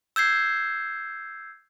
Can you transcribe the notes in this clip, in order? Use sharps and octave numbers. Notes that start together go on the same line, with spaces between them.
E6 G6 G#6 C7